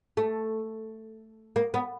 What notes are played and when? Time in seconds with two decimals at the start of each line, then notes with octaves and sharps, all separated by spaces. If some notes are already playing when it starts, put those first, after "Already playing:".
0.17 A3
1.56 A#3
1.74 B3